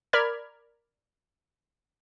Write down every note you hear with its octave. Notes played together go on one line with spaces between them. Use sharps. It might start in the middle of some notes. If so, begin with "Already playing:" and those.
A#4 D5 B5 F6 G#6